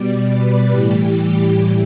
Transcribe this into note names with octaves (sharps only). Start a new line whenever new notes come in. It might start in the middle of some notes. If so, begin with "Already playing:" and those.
Already playing: B2 G3 D5
B4
A2 E3 G3 G4